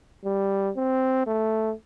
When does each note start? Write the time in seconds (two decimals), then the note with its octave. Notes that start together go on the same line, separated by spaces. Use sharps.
0.25 G3
0.76 C4
1.27 A3